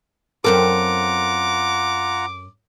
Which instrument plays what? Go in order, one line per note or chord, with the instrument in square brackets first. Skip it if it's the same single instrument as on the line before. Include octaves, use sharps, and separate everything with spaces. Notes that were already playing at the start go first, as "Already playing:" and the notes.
[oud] F#2 C4 A4 [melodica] F4 F#5 A#5 [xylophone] A#4 [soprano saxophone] D6